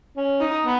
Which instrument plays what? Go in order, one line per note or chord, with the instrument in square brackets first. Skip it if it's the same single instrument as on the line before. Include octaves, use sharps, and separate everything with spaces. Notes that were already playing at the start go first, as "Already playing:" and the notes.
[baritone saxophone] C#4
[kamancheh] D#4
[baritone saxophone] B3